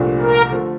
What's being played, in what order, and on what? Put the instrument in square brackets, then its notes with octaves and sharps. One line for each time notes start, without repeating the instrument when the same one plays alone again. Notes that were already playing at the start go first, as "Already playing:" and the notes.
Already playing: [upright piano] C2 A#2 F3 A3 D4
[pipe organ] A#4
[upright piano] D3 F3 A3